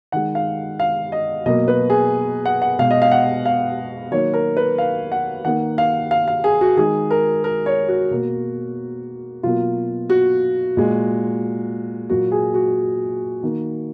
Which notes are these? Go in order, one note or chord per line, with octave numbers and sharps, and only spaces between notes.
D#3 G#3 F#5
F5
F5
D#5
B2 F#3 A#3 D#5
B4
G#4
F#5
F#5
B2 G#3 F5
D#5
F5
F#5
F5
D#3 F#3 A#3 C#5
A#4
B4
F5
F#5
D#3 A#3 F#5
F5
F5
F5
G#4
F#4
D#3 G#3 G#4
A#4
A#4
C#5
F#4
B2 A#3
B2 F#3 A#3 F4
F#4
A#2 G#3
A#2 F#3 A#3 F#4
G#4
F#4
D#3 A#3